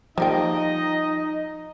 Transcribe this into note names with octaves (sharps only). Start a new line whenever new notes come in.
F3 G3 A#3 D#4 D#5 G5